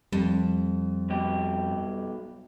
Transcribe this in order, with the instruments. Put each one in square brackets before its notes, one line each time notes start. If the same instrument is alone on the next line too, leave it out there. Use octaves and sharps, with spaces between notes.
[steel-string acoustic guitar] F2 [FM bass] G3
[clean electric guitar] B1 B2 G4